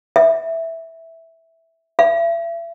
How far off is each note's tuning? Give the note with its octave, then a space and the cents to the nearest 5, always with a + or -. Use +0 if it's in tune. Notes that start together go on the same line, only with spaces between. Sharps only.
E5 -5
E5 +35